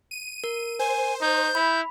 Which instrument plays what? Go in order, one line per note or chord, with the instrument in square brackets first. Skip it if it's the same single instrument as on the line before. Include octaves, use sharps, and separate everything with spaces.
[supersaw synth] D#7
[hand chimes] A#4
[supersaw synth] C5 [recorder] G#5
[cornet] D#4 [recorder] G6
[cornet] E4 [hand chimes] B5